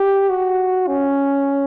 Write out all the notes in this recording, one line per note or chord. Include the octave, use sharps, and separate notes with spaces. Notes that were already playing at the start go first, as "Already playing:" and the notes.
Already playing: G4
F#4
C#4